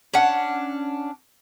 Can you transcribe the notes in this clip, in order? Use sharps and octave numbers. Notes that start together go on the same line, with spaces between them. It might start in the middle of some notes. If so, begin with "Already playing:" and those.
C#4 D4 F#5